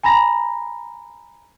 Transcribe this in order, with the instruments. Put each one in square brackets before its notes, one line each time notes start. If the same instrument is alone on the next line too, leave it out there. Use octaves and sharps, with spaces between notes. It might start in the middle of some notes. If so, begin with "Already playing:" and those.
[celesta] G#5 A#5 B5 A#6